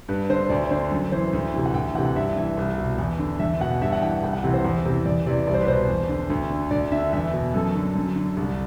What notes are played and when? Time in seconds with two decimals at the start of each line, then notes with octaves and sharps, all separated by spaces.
0.09 G2 B4
0.29 D3 C5
0.50 D2 D5
0.64 D5
0.71 D3 C5
0.92 F#2
1.12 E3 C5
1.33 D2
1.54 C3 E3
1.66 F#5
1.74 D2 G5
1.95 E3 F#5
1.98 C3
2.07 F#5
2.15 G2 E5
2.36 E3 E5
2.57 C2
2.78 B2
2.98 E2
3.19 D3
3.39 E2 E5
3.60 B2 F#5
3.82 G2 E5
3.93 F#5
4.02 E3 G5
4.23 C2 G5
4.33 F#5
4.44 C3 E3
4.54 C5
4.64 E2
4.85 C3 E3
5.06 E2 D5
5.26 C3 E3 D5
5.47 C2 D5
5.54 C5
5.61 B4
5.67 B2 C5
5.88 E2
6.09 D3
6.30 D2
6.50 D3
6.71 D2 D5
6.92 D3 E5
7.13 E2 E5
7.33 B2
7.54 F#2 A4
7.75 D3
7.95 F#2
8.16 D3
8.37 C2